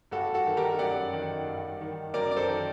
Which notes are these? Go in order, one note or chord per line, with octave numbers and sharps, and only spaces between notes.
G2 F#4 A4
F#4 A4
D#3
G4 A#4
F#2 D5 F#5
D#3
G2
D#3
F#2 A#4 D5
D5
A4 C5
D#3